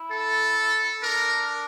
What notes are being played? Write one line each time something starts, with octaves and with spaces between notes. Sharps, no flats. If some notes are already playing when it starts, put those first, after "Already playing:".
Already playing: E4
A4
D4 A#4